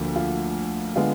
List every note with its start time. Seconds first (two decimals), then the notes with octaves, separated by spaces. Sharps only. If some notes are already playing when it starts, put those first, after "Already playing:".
Already playing: D2 D3 F3 A#3
0.16 F4
0.96 D3 G#3 B3 F4